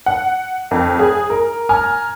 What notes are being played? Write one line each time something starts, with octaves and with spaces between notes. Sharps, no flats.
F#5
F2
G#4
A#4
G#5 A#5 F6